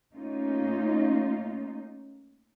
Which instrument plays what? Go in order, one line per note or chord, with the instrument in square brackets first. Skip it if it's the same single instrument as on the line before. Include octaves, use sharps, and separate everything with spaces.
[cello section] A3 A#3 C#4 D#4 F4